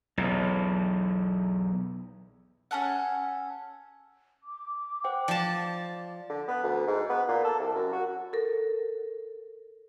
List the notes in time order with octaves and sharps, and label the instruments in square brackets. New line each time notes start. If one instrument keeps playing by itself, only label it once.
[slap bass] B1 E2
[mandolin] C#4 G#4 A4 F#5
[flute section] D6
[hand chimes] C5 F#5 G5
[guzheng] F3 A5 [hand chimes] D5
[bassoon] D3
B3
D2
G#2
B3
A#2
A4
C2
F#2
F#4
[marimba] A4 A#4